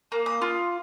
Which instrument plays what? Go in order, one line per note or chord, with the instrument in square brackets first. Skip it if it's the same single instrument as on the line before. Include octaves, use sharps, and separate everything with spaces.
[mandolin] A#3
D#6
F4